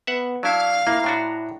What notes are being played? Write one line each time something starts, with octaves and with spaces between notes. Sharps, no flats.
B3 E5 F#5
F#3 D4 E4 F5
A#3 E4 A#5
A2 D4 F#4